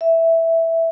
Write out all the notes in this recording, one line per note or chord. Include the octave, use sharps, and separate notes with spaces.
E5